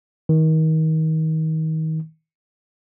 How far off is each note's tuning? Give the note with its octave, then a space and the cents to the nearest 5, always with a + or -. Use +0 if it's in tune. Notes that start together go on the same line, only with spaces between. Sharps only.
D#3 +30